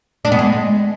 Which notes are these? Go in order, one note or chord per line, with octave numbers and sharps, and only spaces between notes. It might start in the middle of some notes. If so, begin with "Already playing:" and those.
D4
B3
G#3